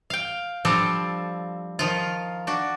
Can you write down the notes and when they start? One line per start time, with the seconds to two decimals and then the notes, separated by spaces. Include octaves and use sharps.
0.10 F5 G5
0.65 F3 G3 C4 D4 A4
1.79 D#3 F3 F4
2.47 D4 F#4